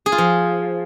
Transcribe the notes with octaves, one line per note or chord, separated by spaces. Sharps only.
G#4
F4
F3